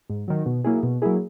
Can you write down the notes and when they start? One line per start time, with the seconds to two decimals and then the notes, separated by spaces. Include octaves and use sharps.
0.10 G#2
0.28 D#3 F#3
0.46 B2
0.64 F#3 A#3 E4 G#4
0.83 B2
1.02 F#3 A#3 E4 G#4